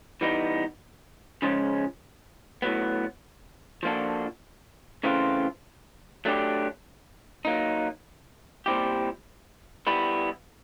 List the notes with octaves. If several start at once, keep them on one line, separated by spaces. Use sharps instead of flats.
E3 G3 B3 D#4
C#3 F3 G#3 C#4
A2 F#3 B3
F3 A#3 D4 F#4 A4
C#3 E3 A3 C4 F4
F#3 A3 D4 G4
F#3 A#3 D#4
A#2 G3 C4 E4 G4
G3 B3 E4